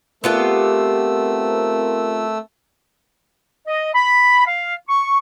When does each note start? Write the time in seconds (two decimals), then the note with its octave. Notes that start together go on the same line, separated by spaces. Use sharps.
0.24 A3 B3 C4 F4 G4 A#4 E6
3.67 D#5
3.94 B5
4.46 F5
4.88 C#6